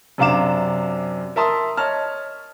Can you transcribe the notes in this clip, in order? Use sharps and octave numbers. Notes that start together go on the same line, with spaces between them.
F#2 C3 D4 F5 D6 E7
A#4 E5 A5 C6 D#6
C#5 D#5 A5 F6